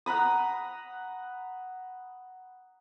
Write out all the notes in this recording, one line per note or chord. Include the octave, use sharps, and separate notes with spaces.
F#5 A#5 B5 D#6